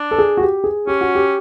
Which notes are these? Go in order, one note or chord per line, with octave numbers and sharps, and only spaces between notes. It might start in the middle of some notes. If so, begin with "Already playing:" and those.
Already playing: D4
A4
G#4
F#4
G4
G#4
C#4 G4
F#4
G4